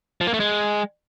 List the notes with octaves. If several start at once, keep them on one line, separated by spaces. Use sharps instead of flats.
F3
A#3
A3
G#3